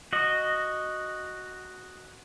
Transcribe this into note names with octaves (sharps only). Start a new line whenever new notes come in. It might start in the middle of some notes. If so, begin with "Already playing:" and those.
F#4 D#5